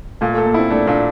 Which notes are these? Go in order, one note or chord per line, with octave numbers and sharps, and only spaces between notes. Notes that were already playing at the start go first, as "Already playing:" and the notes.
A#2 A3
A3
A4
A#3
C4 E4
A3 D4
A#2 D4